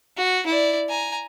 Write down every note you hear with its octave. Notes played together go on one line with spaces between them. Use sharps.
F#4
E4 D5
G#5 A#5